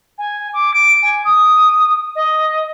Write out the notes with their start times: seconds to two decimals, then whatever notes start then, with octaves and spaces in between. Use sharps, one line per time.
0.18 G#5
0.53 D6
0.73 D7
1.02 G#5
1.24 D#6
2.15 D#5